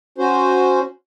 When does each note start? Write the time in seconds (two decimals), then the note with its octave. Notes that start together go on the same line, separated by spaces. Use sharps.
0.18 C#4 F#4 C5